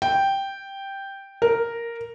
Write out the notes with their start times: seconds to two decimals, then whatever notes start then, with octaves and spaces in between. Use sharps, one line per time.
0.02 G5
1.42 A#4